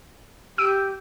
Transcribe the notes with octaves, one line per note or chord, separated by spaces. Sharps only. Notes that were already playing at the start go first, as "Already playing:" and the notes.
G4 E6 D7 D#7